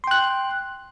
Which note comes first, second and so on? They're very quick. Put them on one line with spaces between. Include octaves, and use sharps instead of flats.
C6 G5 F#6